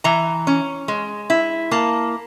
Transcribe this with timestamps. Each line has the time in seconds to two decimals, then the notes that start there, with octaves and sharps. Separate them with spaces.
0.04 E3 A#5
0.47 C#4
0.88 G#3
1.30 E4
1.71 A#3 A5